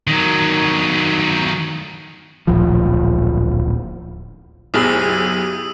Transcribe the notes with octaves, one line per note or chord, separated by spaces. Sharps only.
D#3 F#3
D1 A#1 F3
F#1 B1 E4 G4 G#4 D#6 E6